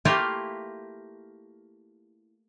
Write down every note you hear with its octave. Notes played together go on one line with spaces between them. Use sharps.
A3 A#3 E4 F4 G4